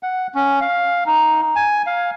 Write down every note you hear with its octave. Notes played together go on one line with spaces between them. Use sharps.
F#5
C#4
F5
D#4
G#5
F5